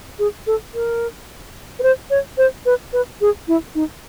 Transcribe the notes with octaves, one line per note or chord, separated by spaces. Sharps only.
G#4
A4
A#4
B4
C5
C#5
C5
B4
B4
G#4
E4
D#4